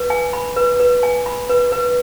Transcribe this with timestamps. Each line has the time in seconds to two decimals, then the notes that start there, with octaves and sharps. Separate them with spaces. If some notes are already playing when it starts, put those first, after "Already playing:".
Already playing: B4
0.10 G#5
0.33 B5
0.56 B4
0.80 B4
1.03 G#5
1.26 B5
1.49 B4
1.72 B4